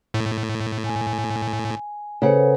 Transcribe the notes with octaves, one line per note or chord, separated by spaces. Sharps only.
A2
G#5
C#3 A4 B4 C5 F#5